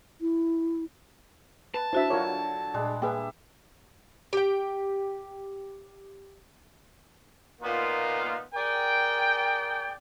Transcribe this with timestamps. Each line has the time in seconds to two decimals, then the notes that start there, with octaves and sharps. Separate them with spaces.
0.21 E4
1.74 B4 A5
1.93 D4 E4 F#4 C5 E5
2.10 D3 F#3 F4 A#4 C#5 D6
2.74 A#2 G3 G#3 D4 G#4
3.02 A#3 G4 G#4 B4 E5 G5
4.33 G4 G5
7.61 A#2 A#3 B3 D#4 F4
8.54 G#4 A#4 D5 G5